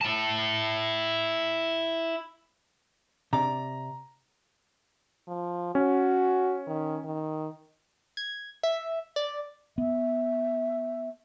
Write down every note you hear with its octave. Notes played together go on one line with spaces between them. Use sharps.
E4 A5
C3 D5 A#5
F3
C#4 F#4
D#3
D#3
G#6
E5
D5
B3 E5